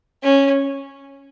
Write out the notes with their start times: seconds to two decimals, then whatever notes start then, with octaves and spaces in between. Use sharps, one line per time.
0.23 C#4